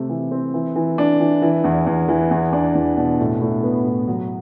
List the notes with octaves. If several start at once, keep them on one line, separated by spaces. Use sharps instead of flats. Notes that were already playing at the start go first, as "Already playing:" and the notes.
Already playing: C3 A3
E3
C4
E3
E3
D4
E3
E3
E2
E2
E3
E2
D4
E2
B2
A2
A2
B3
A2
F#3